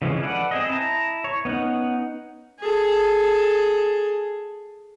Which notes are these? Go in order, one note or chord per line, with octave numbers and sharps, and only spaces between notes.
C#3 E3 F3 G#3 C#4
A4 B4 D5 F5 F#5
C4 G#4 D#5
E4 A5 A#5
C#5
B3 C#4 D#4 F#5
G#4 A4